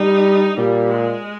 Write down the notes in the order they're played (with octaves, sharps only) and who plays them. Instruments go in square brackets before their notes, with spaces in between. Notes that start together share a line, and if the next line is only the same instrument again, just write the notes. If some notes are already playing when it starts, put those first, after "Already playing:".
Already playing: [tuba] G3 [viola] D#4
[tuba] A#2 [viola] G3
[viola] G#3